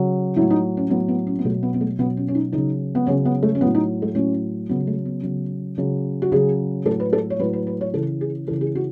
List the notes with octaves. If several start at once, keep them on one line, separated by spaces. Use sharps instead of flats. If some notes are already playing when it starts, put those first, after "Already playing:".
Already playing: C#3 F#3
A2 F#3 E4
D#4
C#4
A2 F#3 B3
B3
C#4
B3
B2 F#3 A3
B3
B3
A3
B2 F#3 B3
C#4
C#4
D#4
C#3 D#4
F#3
B3
C#3 F#3 C#4
B3
A3
C#4
A2 F#3 B3
D#4
A3
A2 F#3 C#4
C#3 F#3 B3
A3
B3
C#3 F#3
C#3 F#3
F#4
C#3 F#3 G#4
A2 F#3 A4
B4
A4
C#5
A2 F#3 B4
B4
B4
C#5
C#3 E3 A4
G#4
C#3 E3 A4
G#4
F#4